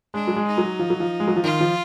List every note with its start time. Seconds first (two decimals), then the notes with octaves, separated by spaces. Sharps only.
0.14 G#3 D4
0.27 F#3
0.36 G#3
0.47 D#4
0.58 F#3
0.79 F3
0.90 F#3
1.00 F3
1.20 G#3
1.28 F#3
1.36 F3
1.44 D#3 F4
1.60 F3